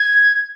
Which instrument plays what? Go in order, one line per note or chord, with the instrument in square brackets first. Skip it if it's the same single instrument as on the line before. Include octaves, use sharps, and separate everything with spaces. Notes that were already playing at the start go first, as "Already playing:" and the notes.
Already playing: [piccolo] G#6